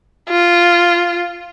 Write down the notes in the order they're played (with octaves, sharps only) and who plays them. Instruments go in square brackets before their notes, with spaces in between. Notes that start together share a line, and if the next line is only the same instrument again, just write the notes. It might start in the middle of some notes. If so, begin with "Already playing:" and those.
[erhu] F4